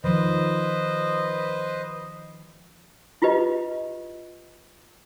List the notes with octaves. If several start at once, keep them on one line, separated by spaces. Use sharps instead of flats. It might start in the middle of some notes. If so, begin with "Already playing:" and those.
D#3 F3 B4 C5 D#5
E4 F4 G4 B4 D#5